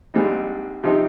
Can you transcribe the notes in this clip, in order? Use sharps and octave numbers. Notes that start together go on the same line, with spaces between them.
A#1 G#2 G3 C4 D#4
C3 F3 C4 D#4 G4